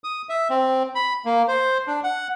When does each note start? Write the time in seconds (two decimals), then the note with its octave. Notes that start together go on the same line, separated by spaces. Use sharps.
0.04 D#6
0.29 E5
0.50 C4
0.95 B5
1.25 A#3
1.48 C5
1.87 D4
2.04 F#5